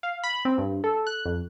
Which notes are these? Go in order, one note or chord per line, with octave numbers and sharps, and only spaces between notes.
F5
B5
C4
G2
A4
F#6
F2